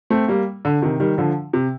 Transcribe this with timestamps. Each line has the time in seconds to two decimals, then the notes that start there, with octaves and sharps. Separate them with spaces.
0.10 A3 C4
0.28 G3 A#3
0.65 D3
0.82 C3 D#3
1.00 D#3 G3
1.18 D3 F3
1.53 C3